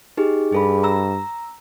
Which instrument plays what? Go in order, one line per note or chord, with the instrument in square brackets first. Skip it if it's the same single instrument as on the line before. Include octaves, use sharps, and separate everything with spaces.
[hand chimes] D#4 G4 G#4
[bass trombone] G2 [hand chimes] G#4 A4 B5
[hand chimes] A#5 E6